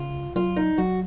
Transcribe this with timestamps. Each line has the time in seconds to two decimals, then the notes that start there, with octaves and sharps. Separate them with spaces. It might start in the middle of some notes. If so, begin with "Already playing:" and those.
Already playing: C#3 F4
0.14 C#2
0.36 F#3 F4
0.56 C#2 D#4
0.78 F#3 F#4